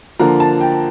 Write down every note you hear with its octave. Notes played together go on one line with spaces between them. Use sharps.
D3 F3 A#3 A#5
A5
G5